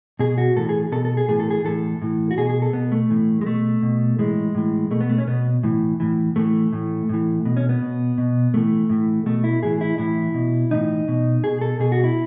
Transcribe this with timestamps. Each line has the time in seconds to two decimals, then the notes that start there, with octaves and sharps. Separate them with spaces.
0.19 B2 G#4
0.38 F#4
0.56 A2 E3 A4
0.69 G#4
0.92 B2 A4
1.05 A4
1.17 G#4
1.28 A2 E3 G#4
1.40 A4
1.51 G#4
1.65 A2 E3 A4
2.02 A2 E3
2.31 F#4
2.38 B2 G#4
2.49 G#4
2.62 A4
2.73 B2 B3
2.92 A3
3.10 A2 E3
3.41 G#3
3.46 B2 A3
3.82 B2
4.19 A2 E3 G#3
4.55 A2 E3
4.91 B2 A3
5.01 B3
5.09 A3
5.18 C#4
5.27 B2 B3
5.63 A2 E3
6.00 A2 E3
6.36 A2 E3 A3
6.72 A2 E3
7.09 A2 E3
7.45 B2
7.57 C#4
7.69 B3
7.82 B2
8.18 B2
8.54 A2 E3 A3
8.89 A2 E3
9.26 B2 A3
9.44 E4
9.63 A2 E3 G#4
9.81 E4
9.98 A2 E3 E4
10.34 B2
10.71 A2 E3 D#4
11.08 B2
11.44 B2 G#4
11.61 A4
11.79 B2 G#4
11.92 F#4
12.04 E4